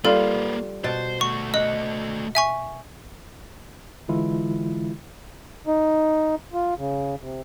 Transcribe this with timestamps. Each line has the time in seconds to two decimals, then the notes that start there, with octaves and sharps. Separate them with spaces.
0.05 G3 A#3 F4 A4 B4
0.84 B2 C5 A5
1.21 A3 F#4 C#6
1.54 D#5 F#5
2.35 E5 G#5 C#6
4.08 D3 E3 G#3 E4 F4
5.67 D#4
6.54 F4
6.78 C#3
7.21 C3